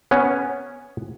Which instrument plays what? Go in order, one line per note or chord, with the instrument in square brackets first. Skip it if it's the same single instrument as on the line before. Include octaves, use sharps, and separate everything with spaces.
[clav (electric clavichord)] B3 C#4